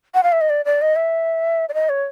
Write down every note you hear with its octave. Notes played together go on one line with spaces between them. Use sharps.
F#5
F5
E5
D#5
D5
D5
D#5
E5
D5
D#5
C#5